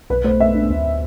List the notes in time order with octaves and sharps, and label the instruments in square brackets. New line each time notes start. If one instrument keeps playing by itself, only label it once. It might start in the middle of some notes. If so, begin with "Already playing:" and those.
[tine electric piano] B1 [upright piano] B4
[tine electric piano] A3 [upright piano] C5
[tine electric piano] A3 [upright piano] E5
[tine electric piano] D4
D2